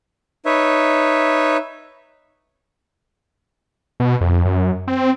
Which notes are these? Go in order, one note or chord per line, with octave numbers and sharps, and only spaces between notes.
D#4 B4 C#5 E5
B2
F2
F#2
C4